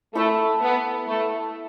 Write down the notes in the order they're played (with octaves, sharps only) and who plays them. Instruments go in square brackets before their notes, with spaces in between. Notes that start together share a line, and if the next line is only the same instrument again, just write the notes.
[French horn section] A3 [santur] E4 A4 E5
[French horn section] B3
A3